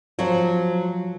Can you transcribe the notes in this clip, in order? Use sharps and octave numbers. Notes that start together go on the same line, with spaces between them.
F3 F#3 C5